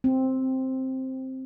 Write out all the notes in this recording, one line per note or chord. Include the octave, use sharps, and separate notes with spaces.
C4